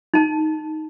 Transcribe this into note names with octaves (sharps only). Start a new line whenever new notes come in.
D#4 A5